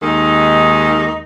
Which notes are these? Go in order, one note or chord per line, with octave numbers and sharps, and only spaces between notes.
D#2 D#3 G#3 D#4